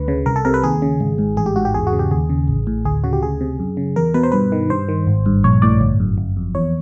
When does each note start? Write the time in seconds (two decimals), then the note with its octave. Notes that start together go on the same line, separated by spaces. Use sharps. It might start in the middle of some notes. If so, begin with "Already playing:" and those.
Already playing: D2 D3 B4
0.08 C#3
0.26 C2 A#4
0.36 A4
0.45 C3 A#4
0.54 B4
0.64 D#2 G#4
0.82 C#3
1.00 G#1
1.18 G#2
1.37 A1 G#4
1.46 G4
1.56 G#2 F#4
1.65 G4
1.74 E2 G#4
1.87 F#4
1.93 C#3
1.99 G4
2.11 D#2 G#4
2.30 C#3
2.48 A1
2.67 A2
2.85 D2 G#4
3.04 C#3 F#4
3.13 G4
3.23 D2 G#4
3.41 C3
3.59 F#2
3.77 C#3
3.96 E2 A#4
4.14 B2 B4
4.23 C5
4.32 G2 B4
4.52 D#3
4.70 G2 C5
4.89 D#3
5.07 G#1
5.26 G2
5.44 A#1 C#5
5.62 A2 D5
5.81 G1
6.00 F#2
6.18 G1
6.37 F2
6.55 E2 C#5